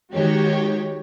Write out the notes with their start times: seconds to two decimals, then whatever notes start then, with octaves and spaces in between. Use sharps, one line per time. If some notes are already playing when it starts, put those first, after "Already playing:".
0.12 D#3 G#3 F#4 G4 C#5